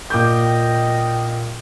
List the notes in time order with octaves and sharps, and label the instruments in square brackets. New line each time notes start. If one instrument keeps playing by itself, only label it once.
[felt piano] A#2 D6 G6 [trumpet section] D#5 G5